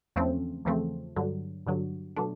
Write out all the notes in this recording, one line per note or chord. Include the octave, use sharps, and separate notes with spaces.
E2 C#3 F3 A3 C4
E2 C#3 F3 A3 C4
G2 D3 F#3
G2 D3 F#3
B2 F#3 A3 D4